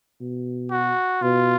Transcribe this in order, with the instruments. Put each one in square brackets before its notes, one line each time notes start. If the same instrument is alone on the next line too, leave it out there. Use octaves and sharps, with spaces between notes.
[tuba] B2
[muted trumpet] F#4
[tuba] B2 [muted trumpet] F4